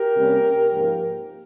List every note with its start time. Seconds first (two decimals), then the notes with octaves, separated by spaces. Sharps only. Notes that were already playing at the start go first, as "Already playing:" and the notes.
Already playing: G4 A#4
0.16 C3 G3 A#3 C#4
0.72 G#2 F3 A#3